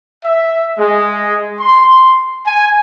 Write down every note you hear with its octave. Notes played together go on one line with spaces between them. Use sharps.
E5
G#3
C6
G#5